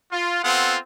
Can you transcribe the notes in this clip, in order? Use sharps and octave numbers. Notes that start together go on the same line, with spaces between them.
F4
B3 C4 F4 A4 F#5